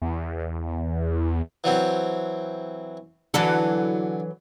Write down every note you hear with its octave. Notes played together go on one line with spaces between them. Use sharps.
E2
E3 F#3 C4
D3 E3 F#3 A4